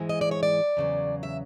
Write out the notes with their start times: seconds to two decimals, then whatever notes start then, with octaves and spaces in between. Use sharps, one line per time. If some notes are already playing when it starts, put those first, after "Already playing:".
Already playing: G#2 E3 G#3
0.09 D#5
0.21 D5
0.31 C#5
0.43 D5
0.77 E2 C#3 F#3
1.23 E5